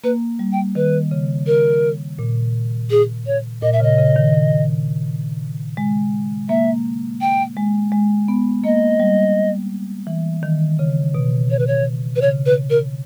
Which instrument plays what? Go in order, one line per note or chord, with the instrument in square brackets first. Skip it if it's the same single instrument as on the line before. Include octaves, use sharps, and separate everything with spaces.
[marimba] A#3 [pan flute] B4
[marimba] G3
[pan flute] G5
[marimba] D#3 [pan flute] B4
[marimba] C#3
[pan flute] A#4
[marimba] A#2
[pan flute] G#4
C#5
[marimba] A#2 [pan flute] D#5
[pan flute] E5
[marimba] C#3 [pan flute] D#5
[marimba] C#3
D#3
C#3
G#3
[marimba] A#3 [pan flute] E5
[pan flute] G5
[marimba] G#3
G#3
B3
[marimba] A#3 [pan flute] D#5
[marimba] G3
E3
D#3
C#3
B2
[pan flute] C#5
B4
C#5
B4
[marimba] C#3 [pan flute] C#5
[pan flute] B4
A#4